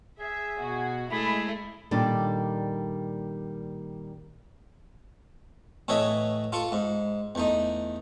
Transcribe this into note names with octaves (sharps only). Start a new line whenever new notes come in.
G#4 E5
B2 F#4
G#3 A3 E4 G#4 B5
A#2 D#3 G3 D4 F4 A4
A2 E3 A4 C#5 D#5 E5
F4 A4 C#6
G#2
E2 A3 D#4